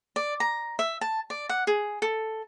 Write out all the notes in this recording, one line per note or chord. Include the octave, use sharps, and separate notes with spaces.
D5
A#5
E5
A5
D5
F#5
G#4
A4